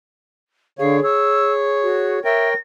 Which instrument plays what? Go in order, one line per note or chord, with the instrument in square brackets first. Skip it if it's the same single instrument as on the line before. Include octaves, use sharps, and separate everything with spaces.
[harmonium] D3 C#5 [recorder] G#4 [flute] F5
[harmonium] C#5 [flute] E6
[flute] F#4
[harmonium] A#4 C#5 G5 [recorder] E5 [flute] A#6